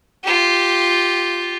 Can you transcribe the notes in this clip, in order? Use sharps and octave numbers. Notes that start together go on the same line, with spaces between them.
F4 G4